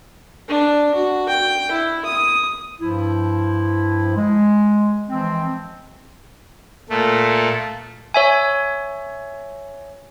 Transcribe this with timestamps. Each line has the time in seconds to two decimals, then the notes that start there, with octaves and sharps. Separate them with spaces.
0.48 D4
0.94 F#4
1.29 G5
1.71 E4
2.05 D#6
2.80 G2 F3 E4
4.16 G#3
5.10 E3 F3 G#3 C4
6.90 A#2 A3
8.14 C#5 E5 G#5